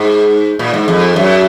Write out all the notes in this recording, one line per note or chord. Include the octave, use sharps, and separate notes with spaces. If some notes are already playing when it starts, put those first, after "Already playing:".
Already playing: G#2
A#2
G#2
F2
F#2